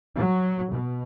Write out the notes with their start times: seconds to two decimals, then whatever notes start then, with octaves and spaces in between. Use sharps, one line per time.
0.16 F#3
0.69 B2